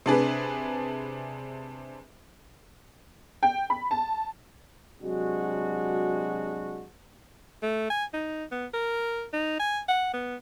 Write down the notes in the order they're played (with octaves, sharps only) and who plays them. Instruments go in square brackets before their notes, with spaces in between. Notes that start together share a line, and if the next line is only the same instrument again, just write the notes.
[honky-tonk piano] C3 D4 G#4 B4
G5
B5
A5
[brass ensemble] C3 F#3 G#3 D4 F#4
[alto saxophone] A3
G#5
D#4
B3
A#4
D#4
G#5
F#5
B3